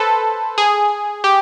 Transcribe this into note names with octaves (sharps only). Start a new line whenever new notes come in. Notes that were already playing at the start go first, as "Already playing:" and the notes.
Already playing: A4 B4 C5
G#4
G4